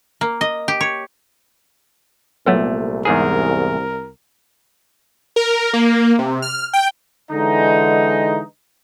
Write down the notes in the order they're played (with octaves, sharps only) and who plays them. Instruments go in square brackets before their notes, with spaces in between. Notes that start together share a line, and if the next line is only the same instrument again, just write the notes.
[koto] A#3
D#5
G4
C#5
[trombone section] C2 [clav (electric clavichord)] A#2 A3 [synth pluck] F#3 B3 A4
[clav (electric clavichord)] E2 G#2 G#4 [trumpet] A#4
[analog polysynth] A#4
A#3
C3
F6
G5
[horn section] D3 E3 G#3 D#4